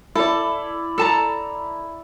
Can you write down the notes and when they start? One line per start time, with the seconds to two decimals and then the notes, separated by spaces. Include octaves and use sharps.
0.15 E4 A4 D5
0.98 A4 A5 A#5